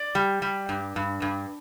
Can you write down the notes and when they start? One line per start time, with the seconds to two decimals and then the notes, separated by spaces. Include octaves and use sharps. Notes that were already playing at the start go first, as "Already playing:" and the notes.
Already playing: D5
0.15 G3
0.42 G3
0.69 G2
0.96 G2
1.22 G2